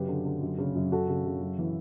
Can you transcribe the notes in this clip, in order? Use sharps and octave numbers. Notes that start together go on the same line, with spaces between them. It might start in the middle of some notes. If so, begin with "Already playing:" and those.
Already playing: F#2 C#3 G4 B4
D3
D3
F#2
C#3
F#2
F#2 F#4 A4
C#3
C#3
F#2
E3